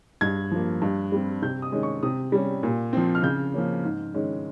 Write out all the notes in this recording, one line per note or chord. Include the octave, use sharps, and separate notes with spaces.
G2 G#6
F3 A#3
G2
G3 C4
C3 G6
D#6
D#3 G#3 C#4
C#6
C3 D#6
G3 C#4
A#2
F3 C4
F6
C#3 G6
F3 A#3 C#4
G#2
D#3 G#3 C#4